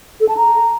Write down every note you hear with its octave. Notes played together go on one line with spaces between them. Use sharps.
A4
A5
A#5